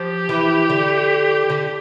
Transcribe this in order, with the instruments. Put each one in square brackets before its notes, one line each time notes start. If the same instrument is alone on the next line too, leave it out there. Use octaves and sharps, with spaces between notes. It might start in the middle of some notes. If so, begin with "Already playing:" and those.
Already playing: [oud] F3 [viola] G4
[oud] E3
D3
D3